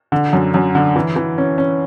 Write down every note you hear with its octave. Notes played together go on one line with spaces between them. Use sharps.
D3
F#2
F#2
D3
E3
E3
C#4
C#4